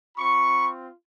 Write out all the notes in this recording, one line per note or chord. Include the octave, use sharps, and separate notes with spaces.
C4 F4 B5 C#6